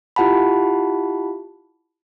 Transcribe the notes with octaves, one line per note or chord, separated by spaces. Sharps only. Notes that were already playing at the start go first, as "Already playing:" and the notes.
E4 F4 G4 F#5 A5 B5